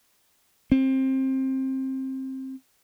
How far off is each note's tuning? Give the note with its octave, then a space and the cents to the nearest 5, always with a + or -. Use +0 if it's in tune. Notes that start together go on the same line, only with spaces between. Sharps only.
C4 +20